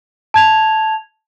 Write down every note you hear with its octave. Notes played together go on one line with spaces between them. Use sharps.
A5 G#6 F7